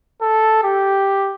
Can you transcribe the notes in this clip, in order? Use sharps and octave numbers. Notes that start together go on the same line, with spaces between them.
A4
G4